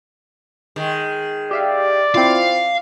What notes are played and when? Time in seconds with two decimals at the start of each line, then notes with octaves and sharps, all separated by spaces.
0.76 D#3 G#3
1.51 G4 D5 E5 F5
2.15 C4 E4 F4 F5